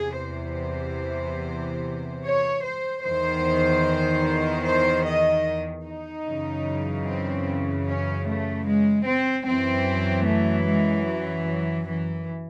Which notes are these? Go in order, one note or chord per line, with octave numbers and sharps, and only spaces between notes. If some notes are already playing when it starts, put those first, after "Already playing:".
Already playing: E2 C3 E3 G#4
C5
C#5
C5
E2 D#3 C5
C5
D#5
D#4
F#2 C#3 E3
C4
C#4
A3
G#3
C4
F#2 E3 C4
A3
G#3
F#3
F#3
E3